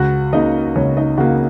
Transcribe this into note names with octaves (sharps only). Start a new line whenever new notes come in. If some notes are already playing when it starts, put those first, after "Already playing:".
Already playing: C#2 F#4 F#5
C#3 A#3 D#4 D#5
C#2 C#4 C#5
D#4 D#5
C#3 A#3 F#4 F#5